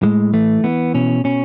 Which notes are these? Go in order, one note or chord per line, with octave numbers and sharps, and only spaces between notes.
A2 G#3
E3 A3
E3 B3
B2 C#4
B2 C#4